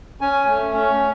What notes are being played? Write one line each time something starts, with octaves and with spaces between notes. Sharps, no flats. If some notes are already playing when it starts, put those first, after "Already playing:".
C#4 G#5
A3
C#4